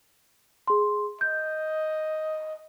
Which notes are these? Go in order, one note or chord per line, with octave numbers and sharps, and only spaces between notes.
G#4 C6
D#5 G6